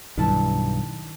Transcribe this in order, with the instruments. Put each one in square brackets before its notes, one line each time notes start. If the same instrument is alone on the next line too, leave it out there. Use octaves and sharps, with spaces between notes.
[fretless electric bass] B1 G2 [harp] D#3 E4 A5